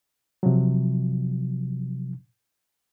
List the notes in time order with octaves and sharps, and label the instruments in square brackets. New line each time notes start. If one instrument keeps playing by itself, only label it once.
[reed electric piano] C3 F3 F#3